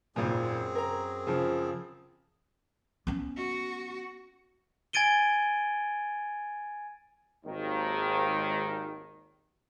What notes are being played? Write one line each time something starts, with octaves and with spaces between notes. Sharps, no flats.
G#1 F#2 A#2 C4 G#4
A#4 A#5
C#3 F3
B3 C#4
F#4
G#5 G#6 A6 D7 D#7 G7
G#1 D#2 D#3